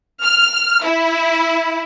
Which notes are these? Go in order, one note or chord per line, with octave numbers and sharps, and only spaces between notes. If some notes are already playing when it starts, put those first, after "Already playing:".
F6
E4